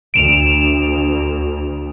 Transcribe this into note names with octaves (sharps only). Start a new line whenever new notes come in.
D2 D7 E7 F7